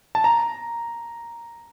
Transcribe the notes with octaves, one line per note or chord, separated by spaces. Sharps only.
A5
A#5